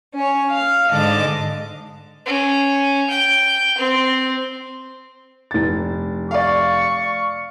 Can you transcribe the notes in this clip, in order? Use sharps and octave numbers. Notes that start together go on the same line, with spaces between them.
C#4 C#5
F5
G#2 D3 D#5 A5 D6
C#4
G5
C4
F1 A6
D5 F5 C#6